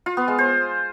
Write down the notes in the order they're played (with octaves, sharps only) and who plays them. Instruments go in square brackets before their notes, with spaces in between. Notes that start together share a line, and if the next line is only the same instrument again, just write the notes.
[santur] F4
B3
G#3
C5